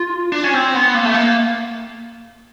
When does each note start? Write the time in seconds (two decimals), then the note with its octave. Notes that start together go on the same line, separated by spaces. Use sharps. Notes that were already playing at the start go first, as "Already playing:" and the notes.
Already playing: F4
0.32 D4
0.44 C#4
0.54 C4
0.74 B3
0.95 A#3
1.05 A3
1.14 A#3